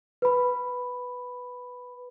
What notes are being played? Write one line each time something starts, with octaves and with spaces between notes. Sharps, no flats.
B4 B5